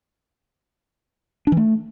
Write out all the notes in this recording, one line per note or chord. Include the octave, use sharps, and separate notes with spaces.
D4
E3
A3